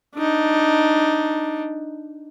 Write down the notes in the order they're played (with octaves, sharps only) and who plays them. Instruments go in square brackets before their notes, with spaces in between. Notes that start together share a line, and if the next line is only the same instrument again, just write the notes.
[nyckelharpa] D4 D#4